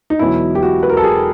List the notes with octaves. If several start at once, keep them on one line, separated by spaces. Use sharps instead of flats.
D#4
E1 E2 B2 F#3 B3 E4
G4
F#4
B4
A#4
A4
G#4